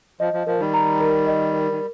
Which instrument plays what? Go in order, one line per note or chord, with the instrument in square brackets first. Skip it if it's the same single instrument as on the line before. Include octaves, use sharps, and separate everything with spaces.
[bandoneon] F3 [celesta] D#5
[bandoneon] F3
[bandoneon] F3 [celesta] A#4
[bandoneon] D#3 G3
[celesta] A#5
A#4
D#5
A#4
[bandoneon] D#3